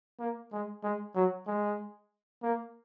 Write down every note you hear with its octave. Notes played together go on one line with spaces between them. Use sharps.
A#3
G#3
G#3
F#3
G#3
A#3